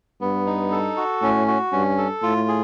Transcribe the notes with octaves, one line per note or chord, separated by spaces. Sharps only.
G2 B3
D#4
A4
F#4
A2 C#4
F#4
G2 C#4
A4
A2 F4
G#4